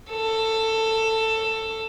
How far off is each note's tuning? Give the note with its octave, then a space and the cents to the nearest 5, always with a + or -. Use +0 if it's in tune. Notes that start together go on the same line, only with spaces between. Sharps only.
A4 +15